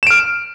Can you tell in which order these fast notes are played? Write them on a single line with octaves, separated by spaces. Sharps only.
E7 D7 F6